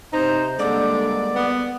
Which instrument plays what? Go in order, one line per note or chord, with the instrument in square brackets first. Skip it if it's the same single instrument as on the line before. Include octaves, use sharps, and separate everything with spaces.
[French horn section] C3 [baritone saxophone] D#4 [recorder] C5
[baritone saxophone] D3 [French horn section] G3 G#3 A#3 [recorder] D5
[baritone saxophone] B3